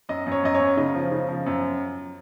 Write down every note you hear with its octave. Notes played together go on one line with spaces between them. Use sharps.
F#2 D#5
F#2
C#5
F#2 D#5
C#5
F#2
C#3 D#5
F3
C#3
F3
F#2